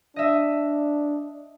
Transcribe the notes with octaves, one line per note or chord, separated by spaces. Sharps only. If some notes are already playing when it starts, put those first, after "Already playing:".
D4 D#5 E5